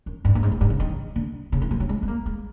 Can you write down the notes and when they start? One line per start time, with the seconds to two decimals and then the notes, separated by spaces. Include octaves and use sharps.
0.06 F#2
0.25 G2
0.35 G2
0.43 G#2
0.51 A2
0.61 G2
0.70 C#3
0.80 D#3
1.16 D3
1.52 C#3
1.62 E3
1.71 F3
1.80 F#3
1.89 G#3
2.03 B3
2.08 A#3
2.26 G#3